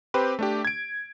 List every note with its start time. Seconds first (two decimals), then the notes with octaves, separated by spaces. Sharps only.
0.14 C4 G4 B4 C5
0.39 A3 D4 G4
0.65 G#6 D7